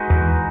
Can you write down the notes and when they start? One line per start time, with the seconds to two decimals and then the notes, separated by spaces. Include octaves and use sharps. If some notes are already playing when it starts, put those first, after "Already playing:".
Already playing: G#3 D#4 F#4 B4
0.10 E2 E3